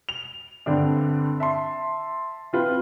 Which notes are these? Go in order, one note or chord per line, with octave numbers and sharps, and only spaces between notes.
F7
G2 D3 C4 D4
E5 A5 C6
C4 F4 B4